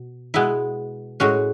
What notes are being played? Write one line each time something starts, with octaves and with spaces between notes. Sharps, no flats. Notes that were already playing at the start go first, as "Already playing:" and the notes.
Already playing: B2
B2 G#3 B3 E4
A2 G#3 C#4 F#4